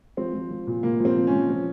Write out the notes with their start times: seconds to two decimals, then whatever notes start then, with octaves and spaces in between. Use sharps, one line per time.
0.17 F3 C4
0.34 F3
0.51 F3
0.67 A#2
0.83 A#2 A#3
1.00 F3
1.05 C4
1.17 F3
1.27 C#4
1.33 F3
1.49 F3